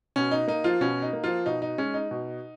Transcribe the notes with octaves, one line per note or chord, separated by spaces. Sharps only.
B2 C#4
D#4
A#3 D#4
F3 F4
B2 C#4
D#4
A#3
F3 F4
B2 D#4
D#4
G#3 C#4
D#4
B2